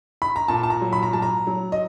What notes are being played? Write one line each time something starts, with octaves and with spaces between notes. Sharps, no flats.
B5
A#5
A#2 A5
A5
A#5
F#3
B5
A#5
F#3 A5
A#5
F#3
D#5